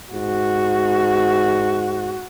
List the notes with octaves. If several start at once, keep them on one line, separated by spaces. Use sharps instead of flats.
G#2 F#4